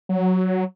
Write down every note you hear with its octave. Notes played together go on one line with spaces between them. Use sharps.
F#3